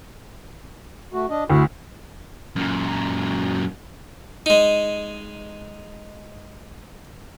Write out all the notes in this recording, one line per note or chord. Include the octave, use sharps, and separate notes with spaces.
A3 F#4
D4 D#5
D2 E4 F#4
F#2 A#2
G#3 D#4